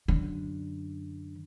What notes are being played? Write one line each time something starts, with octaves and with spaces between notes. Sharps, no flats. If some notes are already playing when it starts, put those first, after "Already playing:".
F#2 D3